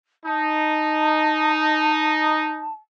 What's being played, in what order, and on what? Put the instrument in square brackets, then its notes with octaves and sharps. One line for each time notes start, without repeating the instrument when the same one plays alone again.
[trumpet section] D#4 [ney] A5